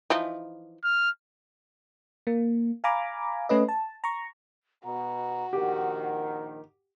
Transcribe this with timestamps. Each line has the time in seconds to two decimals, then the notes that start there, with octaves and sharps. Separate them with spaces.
0.10 E3 F3 D#4
0.84 F6
2.27 A#3
2.84 F5 G#5 A#5 B5 D6
3.49 A3 C#4 B4 D#5
3.68 A5
4.04 A#5 C#6
4.85 B2 F#4 A#5
5.53 A#1 D#3 G4 F#5